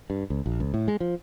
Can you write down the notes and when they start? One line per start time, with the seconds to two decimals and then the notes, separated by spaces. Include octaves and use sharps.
0.10 G2
0.30 C#2
0.46 A#1
0.60 C#2
0.74 A2
0.88 G#3
1.00 F3